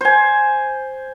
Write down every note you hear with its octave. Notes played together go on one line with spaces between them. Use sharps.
C5 G#5